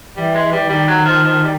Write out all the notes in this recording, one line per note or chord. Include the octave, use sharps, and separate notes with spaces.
E3 G3
G#3
G3
D#3 G3
F#3
F3
F3
G3